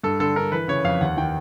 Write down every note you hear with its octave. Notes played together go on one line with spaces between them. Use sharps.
G2 A4
D3 A4
D3 A#4
E3 B4
C#3 C#5
F2 F5
D#2 F#5
D#3 G5